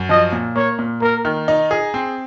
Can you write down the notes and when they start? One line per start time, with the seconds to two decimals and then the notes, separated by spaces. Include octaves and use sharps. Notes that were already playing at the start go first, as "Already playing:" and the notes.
Already playing: F#2
0.09 F3 D#5
0.32 A#2
0.56 A#3 C#5
0.79 A#2
1.02 A#3 A#4
1.25 D#3
1.48 D#4
1.71 G#4
1.94 C4